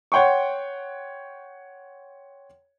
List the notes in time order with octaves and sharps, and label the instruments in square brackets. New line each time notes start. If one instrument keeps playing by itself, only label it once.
[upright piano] C#5 F#5 G5 C6 C#6